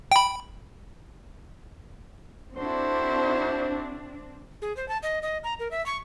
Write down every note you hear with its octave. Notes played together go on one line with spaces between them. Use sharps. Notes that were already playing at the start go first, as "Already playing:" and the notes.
G5 B5
C4 D4 E4 F#4 A4 C5
G#4
C5
A5
D#5
D#5
A#5
A#4
E5
C#6